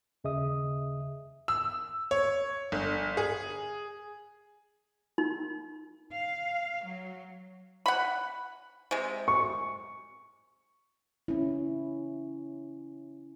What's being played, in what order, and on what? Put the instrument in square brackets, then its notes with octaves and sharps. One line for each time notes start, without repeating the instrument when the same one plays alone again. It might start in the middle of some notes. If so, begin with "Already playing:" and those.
[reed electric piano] D#2 C#3 G#4 D#5 E5 D#6
[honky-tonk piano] E6
C#5
G1
G#4
[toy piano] D#4
[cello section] F5
F#3
[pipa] F#5 B5
C3 G#3
[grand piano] C#6
[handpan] C#4 E4